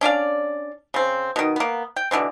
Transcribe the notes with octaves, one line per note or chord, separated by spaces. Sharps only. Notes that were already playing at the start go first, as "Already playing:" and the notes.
C#4 D4 D5 F5
C#3 C4
B2 D#3
A#3 B3
G5
B2 D3 E3 C4